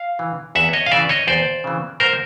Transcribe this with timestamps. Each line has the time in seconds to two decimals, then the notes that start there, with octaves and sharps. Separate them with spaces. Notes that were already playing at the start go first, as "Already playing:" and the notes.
Already playing: F5
0.19 E3
0.55 E2 E5 F#5
0.73 C#5 D#5
0.86 F5
0.92 C#3 E3 D5 E5
1.09 C#5 D#5
1.27 E2 C5 D5
1.64 C#3 E3
2.00 G#2 A#4 C5